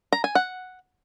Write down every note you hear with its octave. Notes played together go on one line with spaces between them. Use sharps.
A#5
G#5
F#5